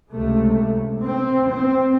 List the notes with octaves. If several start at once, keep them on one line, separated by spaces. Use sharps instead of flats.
C#2 C3 A3
C4
C4